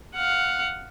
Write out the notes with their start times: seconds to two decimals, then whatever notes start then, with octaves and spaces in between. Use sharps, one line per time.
0.15 F5 F#5